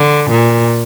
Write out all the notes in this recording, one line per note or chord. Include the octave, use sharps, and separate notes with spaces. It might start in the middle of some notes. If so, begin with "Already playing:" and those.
Already playing: D3
A#2